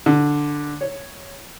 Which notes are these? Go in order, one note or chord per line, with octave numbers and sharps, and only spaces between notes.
D3
C#5